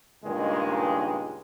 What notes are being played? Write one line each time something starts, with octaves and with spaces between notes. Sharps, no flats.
C#2 G2 A#2 D#3 G#3